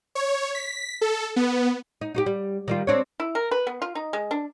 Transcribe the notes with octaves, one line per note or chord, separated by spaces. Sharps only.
C#5
B6
A4
B3
D#4
D#4 F#4 G4
G3
D#3 G3 F4
C4 D4 C#5
E4
A#4
B4
B3
F4
D#4
G#3
D4